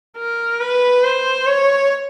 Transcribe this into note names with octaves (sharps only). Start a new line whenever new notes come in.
A#4
B4
C5
C#5